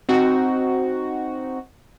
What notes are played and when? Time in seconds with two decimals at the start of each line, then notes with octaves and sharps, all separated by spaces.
0.09 C4 D#4 F#4